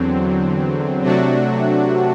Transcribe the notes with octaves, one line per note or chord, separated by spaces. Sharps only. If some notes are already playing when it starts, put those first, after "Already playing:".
Already playing: E2 D3 F#3 C4
C3 F#3 A3 D4 F#4